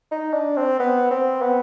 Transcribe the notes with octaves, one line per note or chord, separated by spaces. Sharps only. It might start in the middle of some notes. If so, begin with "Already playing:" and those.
D#4
D4
C4
B3
C4
B3